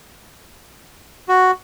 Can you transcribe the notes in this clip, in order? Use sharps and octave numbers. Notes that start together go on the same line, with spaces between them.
F#4